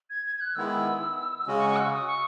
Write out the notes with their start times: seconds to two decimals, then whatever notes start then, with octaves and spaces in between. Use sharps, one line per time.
0.10 G#6
0.26 G#6
0.36 G#6
0.41 F#6
0.55 D#3 G#3 B3 E4 E6
1.47 C#3 G#3 C#4 F#4
1.58 C#6
1.70 C#6
1.76 F#6
1.80 E6
1.92 D#6
2.07 C#6